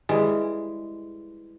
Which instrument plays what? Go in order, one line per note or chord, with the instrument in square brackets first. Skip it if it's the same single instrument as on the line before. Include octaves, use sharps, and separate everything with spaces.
[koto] E3 G3 G#3